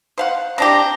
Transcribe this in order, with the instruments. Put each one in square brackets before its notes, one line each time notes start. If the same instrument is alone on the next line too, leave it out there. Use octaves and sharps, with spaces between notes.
[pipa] C5 F5 F#5
[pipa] C4 D4 G4 [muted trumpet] A#5